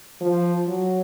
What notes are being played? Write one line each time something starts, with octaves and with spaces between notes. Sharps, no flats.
F3
F#3